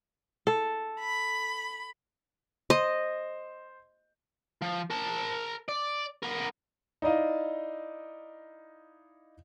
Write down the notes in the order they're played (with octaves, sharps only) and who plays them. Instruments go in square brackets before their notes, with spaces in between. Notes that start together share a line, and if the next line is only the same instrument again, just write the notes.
[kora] A4
[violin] B5
[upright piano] C5 C6 [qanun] D#5
[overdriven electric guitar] F3
A#4 A5
D5
B3 A#4
[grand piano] D#4 E4 D5 D#5 F5